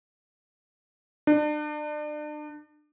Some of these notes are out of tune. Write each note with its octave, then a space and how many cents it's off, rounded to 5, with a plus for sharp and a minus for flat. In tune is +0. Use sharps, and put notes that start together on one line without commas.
D4 +35